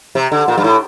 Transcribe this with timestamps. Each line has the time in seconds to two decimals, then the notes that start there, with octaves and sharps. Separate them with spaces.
0.15 C3
0.32 D3
0.48 A#2
0.58 G2
0.64 A2